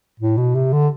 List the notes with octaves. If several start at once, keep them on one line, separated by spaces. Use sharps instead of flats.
A2
B2
C3
D3